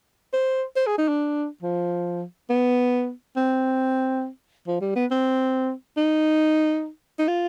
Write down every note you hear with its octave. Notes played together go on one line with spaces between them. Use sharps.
C5
C5
G#4
D#4
D4
F3
B3
C4
F3
G3
B3
C4
D#4
D#4
F4